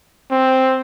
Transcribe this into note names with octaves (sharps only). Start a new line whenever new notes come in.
C4